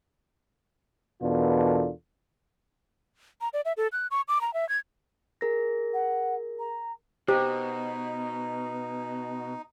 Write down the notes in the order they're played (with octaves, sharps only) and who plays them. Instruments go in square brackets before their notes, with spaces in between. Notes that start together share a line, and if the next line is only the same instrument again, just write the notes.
[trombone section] E2 B2 D4 F4 A4 A#4
[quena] A#5
D5
E5
A4
F#6
C#6
D6
A#5
E5
G#6
[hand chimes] G#4 A#4 A#6
[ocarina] F#5
A#5
[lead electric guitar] B2 [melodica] D#4 [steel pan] G4 [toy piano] C5